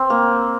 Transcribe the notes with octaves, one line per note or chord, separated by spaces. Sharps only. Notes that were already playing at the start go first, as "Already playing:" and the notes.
Already playing: C4
A#3